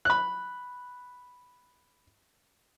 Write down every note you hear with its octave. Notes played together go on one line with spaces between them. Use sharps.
B5 F#6